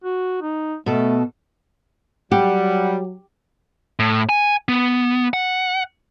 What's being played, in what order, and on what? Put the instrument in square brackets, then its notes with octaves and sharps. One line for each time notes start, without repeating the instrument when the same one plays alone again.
[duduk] F#4
D#4
[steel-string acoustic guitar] B2 A4 [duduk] A3
[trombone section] F#3 [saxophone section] G3 [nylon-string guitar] G4 [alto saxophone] F#5
[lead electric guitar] A2
G#5
B3
F#5